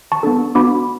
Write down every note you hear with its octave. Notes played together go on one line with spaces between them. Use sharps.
A5 C#6
B3 D4 A4
B3 D4 F#4 B5 D6